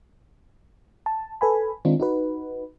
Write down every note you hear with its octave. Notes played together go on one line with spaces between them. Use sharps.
A5
A4 B4 G#5 B5
D#3 G#3 C4 D4 D#4 F4
D#4 F#4 B4